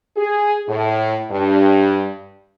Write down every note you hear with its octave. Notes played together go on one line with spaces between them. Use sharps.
G#4
A2
G2